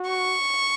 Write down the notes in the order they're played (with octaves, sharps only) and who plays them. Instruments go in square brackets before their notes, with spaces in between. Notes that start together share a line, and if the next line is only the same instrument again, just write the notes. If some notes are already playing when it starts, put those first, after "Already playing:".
Already playing: [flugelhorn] F#4
[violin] C#6